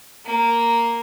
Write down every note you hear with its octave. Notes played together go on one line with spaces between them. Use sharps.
A#3